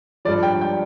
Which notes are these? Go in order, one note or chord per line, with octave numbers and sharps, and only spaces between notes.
G2 F3 D5
G5
G5